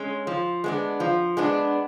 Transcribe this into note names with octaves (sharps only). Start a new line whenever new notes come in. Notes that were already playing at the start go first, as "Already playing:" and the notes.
Already playing: G#3 C#4
F3
G#3 B3 D4
F3
G#3 B3 D4